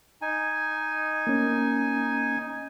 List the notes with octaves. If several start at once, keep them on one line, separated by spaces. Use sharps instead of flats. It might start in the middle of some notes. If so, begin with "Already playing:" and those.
D#4 G#5
A#3 C#4